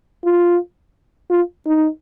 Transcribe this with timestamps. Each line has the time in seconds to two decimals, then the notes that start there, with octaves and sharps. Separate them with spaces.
0.25 F4
1.30 F4
1.66 D#4